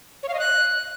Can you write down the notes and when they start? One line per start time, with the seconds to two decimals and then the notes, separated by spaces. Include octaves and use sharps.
0.23 C#5
0.28 F5
0.34 D#5
0.39 F#6